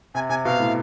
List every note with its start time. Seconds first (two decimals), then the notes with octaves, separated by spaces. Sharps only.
0.15 C3 G#5
0.29 C3 G#5
0.45 B2 F5
0.60 A2